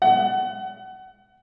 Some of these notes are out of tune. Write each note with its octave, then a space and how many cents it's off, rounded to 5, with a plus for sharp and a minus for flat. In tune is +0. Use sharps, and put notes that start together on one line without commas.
F#5 +30